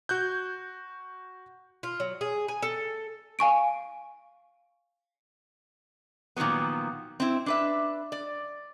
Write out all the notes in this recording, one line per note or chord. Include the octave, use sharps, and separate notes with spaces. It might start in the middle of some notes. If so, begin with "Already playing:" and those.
F#4 F#6 G6
F4
F#3
G#4
G#5
A4
F5 G#5 C#6 D7
A#2 D#3 F3 F#3 B3
C4 E4
D4 B4 E5
D5